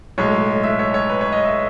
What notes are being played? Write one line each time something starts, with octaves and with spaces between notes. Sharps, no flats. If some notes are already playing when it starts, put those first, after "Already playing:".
B1 A2 G#3 C#5
E5
C#5
C#5
B4
C#5
D#5
E5